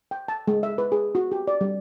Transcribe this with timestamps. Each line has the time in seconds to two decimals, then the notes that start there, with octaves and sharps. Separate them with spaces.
0.11 G5
0.28 A5
0.48 G#3
0.63 E5
0.78 B4
0.92 G#4
1.15 F#4
1.32 G4
1.48 D5
1.61 G3